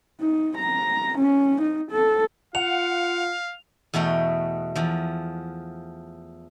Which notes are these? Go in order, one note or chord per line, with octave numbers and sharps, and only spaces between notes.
D#4
A#5
C#4
D#4
A4
F4 F5 F#5 F7
E2 B2 A3 C#5 G5
E2 F3